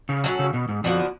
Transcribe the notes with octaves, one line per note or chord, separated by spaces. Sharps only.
C#3
F#3 C#4 F#4 A4
C#3
B2
G#2
F2 D3 F3 B3 F#4